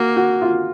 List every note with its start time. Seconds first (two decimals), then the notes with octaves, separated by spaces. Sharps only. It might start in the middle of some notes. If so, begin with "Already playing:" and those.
Already playing: A#3 F#4
0.16 F#4
0.41 F4